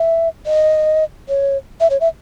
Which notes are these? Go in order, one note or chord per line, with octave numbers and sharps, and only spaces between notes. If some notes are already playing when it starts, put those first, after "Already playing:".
Already playing: E5
D#5
C#5
E5
C#5
E5